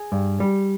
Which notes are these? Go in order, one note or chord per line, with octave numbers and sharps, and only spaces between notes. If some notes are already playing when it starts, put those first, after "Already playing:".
Already playing: G#4
G2
G3